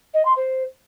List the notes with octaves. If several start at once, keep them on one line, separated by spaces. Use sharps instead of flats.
D#5
C6
C5